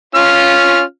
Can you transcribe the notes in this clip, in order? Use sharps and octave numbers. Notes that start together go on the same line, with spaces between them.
C#4 F4 F6